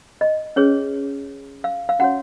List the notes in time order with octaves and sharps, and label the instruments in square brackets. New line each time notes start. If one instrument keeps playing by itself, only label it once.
[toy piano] D#5
C#4 G#4 B4 C#5
F5
F5
C#4 F#4 C#5 F#5